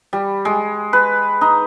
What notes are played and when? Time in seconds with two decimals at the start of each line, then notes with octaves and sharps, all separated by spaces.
0.13 G3
0.45 G#3
0.93 B4
1.41 D#4